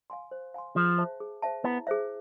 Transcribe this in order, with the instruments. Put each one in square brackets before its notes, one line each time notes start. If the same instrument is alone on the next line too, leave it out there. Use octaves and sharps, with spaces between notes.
[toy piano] F5 G#5 C6
C5
F5 G#5 C6
[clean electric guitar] F3 [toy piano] G#4
[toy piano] C5 E5 A5
G#4
C5 E5 A5
[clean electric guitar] B3 [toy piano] E4
[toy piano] G#4 C5 E5